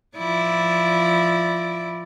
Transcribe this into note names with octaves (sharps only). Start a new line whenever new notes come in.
F3 E4 D5